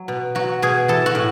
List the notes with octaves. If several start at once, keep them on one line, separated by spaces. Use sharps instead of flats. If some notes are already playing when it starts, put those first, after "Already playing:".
Already playing: F#3
B2
F#3 F#4
B2 G#4
E3 A4
F#4
A2